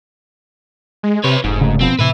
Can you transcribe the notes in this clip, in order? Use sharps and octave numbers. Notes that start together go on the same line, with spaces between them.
G#3
C3 B4 C#5
F1 G#2
C#3 A3
B2 F3 B3 C4
A2 C3 B4 E5